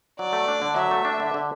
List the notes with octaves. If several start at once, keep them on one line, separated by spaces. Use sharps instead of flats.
F#3 D5
A3
D4
D3
F#3 E5
A3
D4
D3
D3